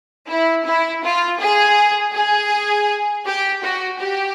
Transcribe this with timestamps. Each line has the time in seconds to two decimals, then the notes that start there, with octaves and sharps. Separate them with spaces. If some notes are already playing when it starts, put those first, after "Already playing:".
0.29 E4
0.66 E4
1.03 F4
1.41 G#4
2.15 G#4
3.26 G4
3.63 F#4
4.01 G4